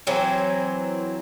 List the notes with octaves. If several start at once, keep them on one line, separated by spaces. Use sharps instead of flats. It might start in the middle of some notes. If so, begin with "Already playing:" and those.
E3 F#3 C4